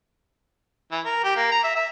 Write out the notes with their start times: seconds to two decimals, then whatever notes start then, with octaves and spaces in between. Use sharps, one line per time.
0.91 E3
1.05 A#4
1.24 G4
1.36 A#3
1.51 A#5
1.63 E5
1.75 E5